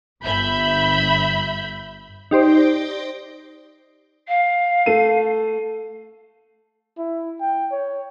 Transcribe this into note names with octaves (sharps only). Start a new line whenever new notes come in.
G1 E5 B5 G6
D#4 G4 C5 D5
F5
A3 A4 D#7
E4
G5
C#5